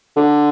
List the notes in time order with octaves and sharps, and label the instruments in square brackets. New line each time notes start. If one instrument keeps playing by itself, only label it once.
[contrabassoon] D3